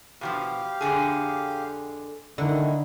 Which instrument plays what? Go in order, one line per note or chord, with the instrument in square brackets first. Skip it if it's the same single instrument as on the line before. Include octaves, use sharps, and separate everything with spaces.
[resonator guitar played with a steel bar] B2 E3 F3 [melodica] G4 F5
[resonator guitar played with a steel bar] F2 D3 G#4
[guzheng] D3 [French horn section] D#3 [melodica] A3 D#4 E4